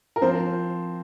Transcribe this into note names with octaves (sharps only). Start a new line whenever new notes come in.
A#4
F3 C4 C5